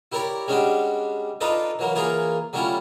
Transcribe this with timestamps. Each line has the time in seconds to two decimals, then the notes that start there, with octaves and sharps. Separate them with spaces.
0.12 E4 G4 A#4 C#5 D5 A#5
0.48 G3 G#3 C#4 D4 F#4 G4
1.41 D4 D#4 F4 A4 B4 D#5
1.79 E3 F#3 A#3
1.95 E3 A#3 F4 G#4 A#4 C#5
2.53 F#3 G3 A3 C#4 E4 F4